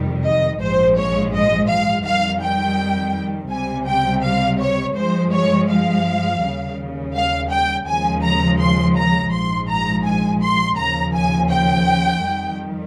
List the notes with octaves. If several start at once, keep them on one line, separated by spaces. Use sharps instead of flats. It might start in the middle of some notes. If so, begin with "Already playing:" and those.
Already playing: F2 C3 D#3 G3
D#5
A#1 G#2 F3 G#3 C5
C#5
D#5
F5
F2 D#3 G3 F5
G5
C#2 C3 G3 G#5
G5
F5
C#5
G2 F3 G#3 C5
C#5
F5
D#2 C#3 G3
F5
G5
D#2 C#3 F3 G#3 G#5
A#5
C6
A#5
A#1 G#2 F3 G#3 C6
A#5
G#5
C6
D#2 C#3 F3 A#5
G#5
G5
F2 D#3 G3